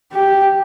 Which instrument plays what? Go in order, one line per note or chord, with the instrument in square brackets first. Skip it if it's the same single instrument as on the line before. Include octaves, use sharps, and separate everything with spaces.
[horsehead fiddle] G4